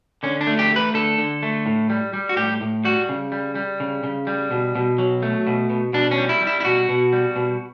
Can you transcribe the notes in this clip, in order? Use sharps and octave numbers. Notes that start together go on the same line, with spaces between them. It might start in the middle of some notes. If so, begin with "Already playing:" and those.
D3 C#4
D4
A3
G4
A3 B4
D3 A4
D3
A3
A2
G3
G3
F#4
A2 G4
A2
G3 F#4
C#3
G3
G3
C#3
C#3
G3
B2
B2
F#3
A3
B2
B2
B2 D4
C#4
G3
E4
G3
E4
E4
B2 F#4
B2
G3
B2